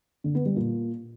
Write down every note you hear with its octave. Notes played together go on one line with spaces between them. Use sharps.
D3
B3
G3
A#2